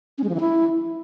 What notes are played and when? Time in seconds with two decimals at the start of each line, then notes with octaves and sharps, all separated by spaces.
0.18 C#4
0.24 G#3
0.29 F3
0.35 E3
0.40 E4